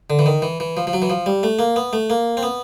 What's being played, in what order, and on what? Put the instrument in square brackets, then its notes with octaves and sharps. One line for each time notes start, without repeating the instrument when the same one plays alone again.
[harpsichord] D3
E3
D#3
E3
E3
F3
F3
F#3
E3
F3
G3
A3
A#3
B3
A3
A#3
C4
B3